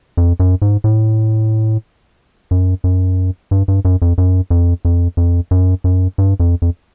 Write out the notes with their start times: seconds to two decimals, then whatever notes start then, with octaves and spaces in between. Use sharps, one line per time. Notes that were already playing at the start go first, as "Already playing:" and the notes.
0.17 F2
0.40 F#2
0.62 G#2
0.84 A2
2.51 F#2
2.84 F#2
3.51 G2
3.68 G2
3.85 F#2
4.02 F2
4.18 F#2
4.50 F2
4.85 F2
5.17 F2
5.51 F#2
5.84 F#2
6.18 G2
6.40 F2
6.62 F2